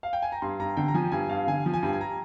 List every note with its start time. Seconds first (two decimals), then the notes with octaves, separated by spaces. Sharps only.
0.03 F5
0.13 G5
0.22 G#5
0.32 A#5
0.42 G2 C6
0.59 G2 A#5
0.77 D3 G5
0.88 A#5
0.94 F3 G#5
1.12 G2 G#5
1.29 G2 F5
1.47 D3 G#5
1.66 F3
1.74 G#5
1.83 G2
1.93 G#5
2.01 A#5